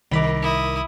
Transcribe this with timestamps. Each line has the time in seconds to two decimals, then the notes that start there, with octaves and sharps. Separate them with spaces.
0.11 C2 D#3 A#4 B5 D6
0.42 E4 D#6